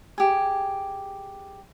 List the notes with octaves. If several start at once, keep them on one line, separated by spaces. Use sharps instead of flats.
G4 G#4